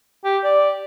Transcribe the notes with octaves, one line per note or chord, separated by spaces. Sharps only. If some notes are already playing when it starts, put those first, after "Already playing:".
G4
D5